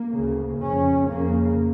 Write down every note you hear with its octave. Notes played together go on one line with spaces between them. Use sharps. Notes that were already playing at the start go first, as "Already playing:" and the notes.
Already playing: A#3
D2 C#3
F2 C#3 C#4
F2 C#3 A#3